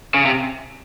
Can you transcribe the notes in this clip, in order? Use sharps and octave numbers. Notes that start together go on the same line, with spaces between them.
C#3
C3